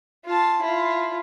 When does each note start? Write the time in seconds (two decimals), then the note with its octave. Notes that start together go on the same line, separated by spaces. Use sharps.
0.25 F4 A5
0.62 E4 F4